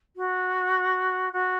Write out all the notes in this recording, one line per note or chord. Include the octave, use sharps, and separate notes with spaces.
F#4
F#4